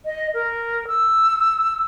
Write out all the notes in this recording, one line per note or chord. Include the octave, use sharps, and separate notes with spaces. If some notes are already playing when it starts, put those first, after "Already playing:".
D#5
A#4
E6